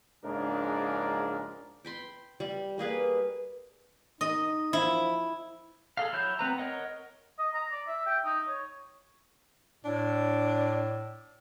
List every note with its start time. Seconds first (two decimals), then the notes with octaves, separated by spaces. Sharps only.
0.24 A#1 G#2 C#3 D4 A#4
1.85 G5 B5 C6
2.40 G3
2.78 G3 A#3 G#4 B4
4.21 D#4 D#5
4.73 F3 E4
5.97 G#4 A4 F5
6.13 F#3 E4 C#5 G6
6.39 B3 C4 B4 A#5
6.58 A#4 C#5 D#5 F#5
7.39 D#5
7.54 A#5
7.71 D5
7.87 E5
8.06 G5
8.25 D#4
8.48 C#5
9.85 A2 D4